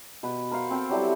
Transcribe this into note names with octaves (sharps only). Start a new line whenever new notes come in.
B2 B4
A#4 C5 F5 F#5
C4 A4 F5 G5
F#3 G3 E4 A4